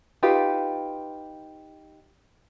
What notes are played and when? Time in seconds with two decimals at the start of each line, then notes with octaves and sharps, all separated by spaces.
0.23 D#4 F4 G4 B4